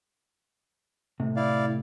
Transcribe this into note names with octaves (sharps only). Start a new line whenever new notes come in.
A2 C3
E4 D5 F5